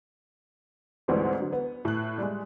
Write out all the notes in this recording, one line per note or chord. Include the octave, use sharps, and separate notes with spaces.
D2 G#2 E3 G3 G#3 C4
D3 F#3
B3
A2 F#6
G3 G#3